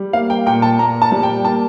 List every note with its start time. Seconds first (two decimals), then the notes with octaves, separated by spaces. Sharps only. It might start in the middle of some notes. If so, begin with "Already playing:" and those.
Already playing: G3
0.13 A#3 F5
0.30 G5
0.46 A#2 G5
0.62 A5
0.79 A#2 A#5
1.02 A5
1.12 G3
1.23 G5
1.45 A#3 A5